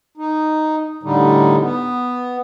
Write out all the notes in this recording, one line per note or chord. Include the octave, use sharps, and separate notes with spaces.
D#4
A2 D3 G3 D#4
B3